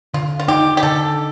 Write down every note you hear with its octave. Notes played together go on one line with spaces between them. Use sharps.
D3 F4
F4
D#4 G4
G4
D3 A4